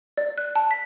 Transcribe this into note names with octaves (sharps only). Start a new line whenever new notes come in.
D5
F#6
A5
B6